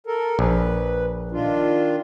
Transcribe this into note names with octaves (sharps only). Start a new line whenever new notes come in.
A4 A#4
A#1 B4
D#3 D4 F4